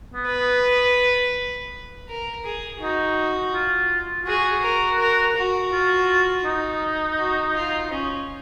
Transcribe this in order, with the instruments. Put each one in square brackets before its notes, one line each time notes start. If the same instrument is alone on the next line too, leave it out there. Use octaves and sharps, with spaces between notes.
[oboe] B3
[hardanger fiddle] B4
[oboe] B3
[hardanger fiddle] A#4
G#4
[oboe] D#4 [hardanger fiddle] F#4
[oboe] F4
[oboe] F#4 [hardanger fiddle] G#4
[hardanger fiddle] A#4
A#4
F#4
[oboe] F4
D#4
[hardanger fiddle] F#4
F4
C#4